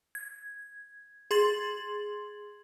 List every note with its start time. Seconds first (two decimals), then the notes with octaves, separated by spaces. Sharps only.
0.15 G#6
1.31 G#4 C6 G#6 A6 F#7